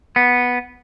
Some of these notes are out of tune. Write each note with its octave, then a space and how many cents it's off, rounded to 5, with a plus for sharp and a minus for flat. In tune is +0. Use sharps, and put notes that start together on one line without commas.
B3 -5